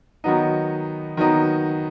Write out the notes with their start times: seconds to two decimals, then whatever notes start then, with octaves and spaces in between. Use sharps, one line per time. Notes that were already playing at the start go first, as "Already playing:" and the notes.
0.24 D#3 F#3 B3 D#4
1.17 D#3 F#3 B3 D#4